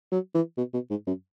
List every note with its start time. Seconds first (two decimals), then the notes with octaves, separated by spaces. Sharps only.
0.12 F#3
0.34 E3
0.58 B2
0.74 B2
0.90 G#2
1.07 F#2